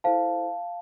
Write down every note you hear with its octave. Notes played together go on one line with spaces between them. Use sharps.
E4 A4 C5 F5 A5